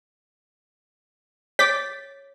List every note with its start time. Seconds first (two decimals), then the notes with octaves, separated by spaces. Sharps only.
1.59 C#5 D6 A6 B6